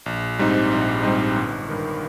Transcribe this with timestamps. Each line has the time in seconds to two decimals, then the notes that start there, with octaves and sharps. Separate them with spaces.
0.06 A#1
0.39 G#2 G3 C4 D#4
0.72 A#1
1.03 G#2 G3 C4 D#4
1.36 G1
1.69 G2 D#3